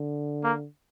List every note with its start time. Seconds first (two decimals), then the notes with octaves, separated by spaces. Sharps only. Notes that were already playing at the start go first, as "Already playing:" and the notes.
Already playing: D3
0.44 A#3